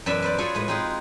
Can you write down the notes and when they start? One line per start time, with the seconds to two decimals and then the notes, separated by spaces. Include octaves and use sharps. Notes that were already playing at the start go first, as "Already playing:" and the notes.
0.06 F#2 B2 E3 F#4 D5 E5
0.22 B4 C5 D5
0.38 F4 F#4 G#4 A4 B4 C#5
0.55 A2 G#3 B4
0.68 G#3 C4 D#4 G#4 B4